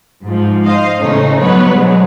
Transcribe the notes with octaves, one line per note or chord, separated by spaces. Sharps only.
G#2 F3
C5 D#5 F5
A2 C#3 E3 A3 C#4 D#4
F#3 G3 B3 B4 C#5
G#2 B2 D3 F#3 G#3